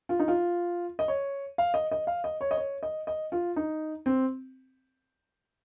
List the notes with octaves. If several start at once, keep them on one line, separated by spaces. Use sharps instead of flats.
F4
D#4
F4
D#5
C#5
F5
D#5
D#5
F5
D#5
C#5
D#5
C#5
D#5
D#5
F4
D#4
C4